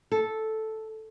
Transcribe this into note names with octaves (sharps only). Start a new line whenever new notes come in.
A4